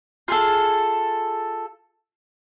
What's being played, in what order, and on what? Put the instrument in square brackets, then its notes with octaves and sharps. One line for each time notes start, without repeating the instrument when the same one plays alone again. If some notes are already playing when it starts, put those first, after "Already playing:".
[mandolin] F4 G#4 A4